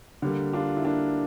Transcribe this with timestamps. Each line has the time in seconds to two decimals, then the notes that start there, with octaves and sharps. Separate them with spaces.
0.22 D3 G3 A#3
0.53 D4 F4
0.76 E4
0.85 A#3 D4